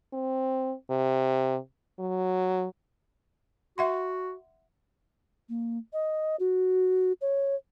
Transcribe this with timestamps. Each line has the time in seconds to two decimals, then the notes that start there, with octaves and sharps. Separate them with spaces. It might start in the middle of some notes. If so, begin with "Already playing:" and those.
0.13 C4
0.90 C3
1.99 F#3
3.78 F#4 E5 F#5 C6
5.49 A#3
5.93 D#5
6.40 F#4
7.21 C#5